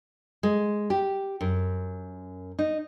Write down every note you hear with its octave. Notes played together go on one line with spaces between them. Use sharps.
G#3
G4
F#2
D#4